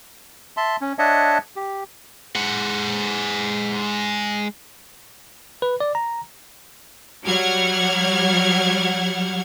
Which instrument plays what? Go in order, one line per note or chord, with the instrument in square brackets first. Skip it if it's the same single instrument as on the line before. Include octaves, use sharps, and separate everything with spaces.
[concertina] E5 A5 C6
C#4
D4 C#5 D#5 E5 F#5 A5
G4
[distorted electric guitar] G#3 F#5
[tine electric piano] B4
D5
A#5
[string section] F#3 G3 F#5 F6 G#6